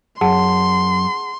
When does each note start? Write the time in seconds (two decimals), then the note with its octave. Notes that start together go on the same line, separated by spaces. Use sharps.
0.21 F#2 G#4 F#5 A5 C6